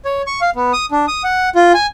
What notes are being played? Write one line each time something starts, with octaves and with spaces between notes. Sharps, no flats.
C#5
C#6
F5
B3
D#6
D4
D#6
F#5
F4
G#5